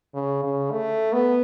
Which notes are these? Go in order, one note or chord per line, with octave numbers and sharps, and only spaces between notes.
C#3
C#3
A3
B3